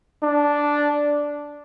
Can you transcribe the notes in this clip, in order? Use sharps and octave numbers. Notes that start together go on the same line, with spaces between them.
D4